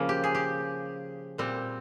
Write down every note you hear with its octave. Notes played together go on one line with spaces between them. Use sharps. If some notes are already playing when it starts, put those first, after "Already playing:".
Already playing: C#3 F3 A#3
G4
G#4
G4
A#2 G3 C4